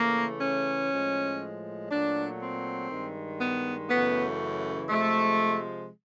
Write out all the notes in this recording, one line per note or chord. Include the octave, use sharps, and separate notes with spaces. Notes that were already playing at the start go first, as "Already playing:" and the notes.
Already playing: C#3 E3 A3 A#3
C#4
A2 F3 G#3
A#2 F#3 A3 D4
C4
G2 D#3 G#3
B3
F#2 C#3 E3 A3 B3
C3 F3 G#3 A3